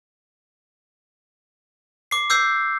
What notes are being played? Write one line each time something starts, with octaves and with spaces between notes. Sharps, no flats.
D6 C7
D6 E6 G6 C7